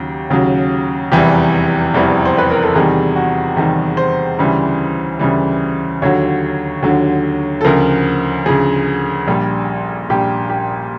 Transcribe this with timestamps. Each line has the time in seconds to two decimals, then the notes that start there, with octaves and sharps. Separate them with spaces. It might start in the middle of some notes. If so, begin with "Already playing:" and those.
Already playing: D#2 C#3 F#3 G4
0.30 D#2 C#3 F#3
1.12 F1 E2 C3 E3 G3 G4
1.94 F1 E2 C3 E3 G3
2.25 C5
2.38 B4
2.51 A#4
2.63 A4
2.75 E2 C3 D#3 G3 G#4
3.16 F#4
3.56 E2 C3 D#3 G3 G4
3.97 C5
4.39 D2 C#3 E3 G3
5.19 D2 C#3 E3 G3
6.02 D#2 D3 F#3 C#5
6.82 D#2 D3 F#3
7.61 A4
7.64 D2 C#3 F3 A#4
8.46 D2 C#3 F3 G#4
9.28 A#1 A#2 G3
10.10 A#1 A#2 G3 G4
10.50 G4